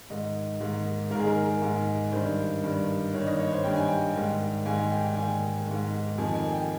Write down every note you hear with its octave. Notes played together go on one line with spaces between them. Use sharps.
G#2 D#3 D#5
G#2 D#3
G#2 D#3 G#4 A#4
A#4
G#2 D#3
G2 D#3 C5
G2 D#3
G2 D#3 C#5
D#5
C#5
C5
G2 D#3 G5
G#5
G5
G#2 D#3
G#2 D#3 G#5
G#5
G5
G5
G#2 D#3 G#5
G#2 D#3
F2 D#3 G#5
G#5
G5